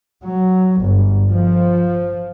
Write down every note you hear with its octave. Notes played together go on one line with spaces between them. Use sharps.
F#3
G1
F3